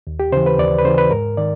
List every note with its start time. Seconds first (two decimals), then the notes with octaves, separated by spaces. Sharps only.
0.07 D#2
0.20 G4
0.32 C#3 E3 C5
0.46 B4
0.59 D#2 D5
0.78 B4
0.85 C#3 E3 C5
0.98 B4
1.11 G#2 A#4
1.37 D#3 D5